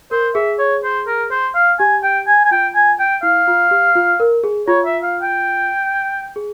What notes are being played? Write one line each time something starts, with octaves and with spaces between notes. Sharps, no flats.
A#4 C5
G#4 E5
C#5
C5
A#4
C5
F5
G4 G#5
G5
G#5
G#5
F4 G5
G#5
G5
E4 F5
F4
G4
F4
A#4
G#4
F4 C#5
E5
F5
G5
G#4